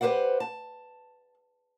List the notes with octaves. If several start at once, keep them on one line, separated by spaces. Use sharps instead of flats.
G4 B4 C5 D5 F#5
A5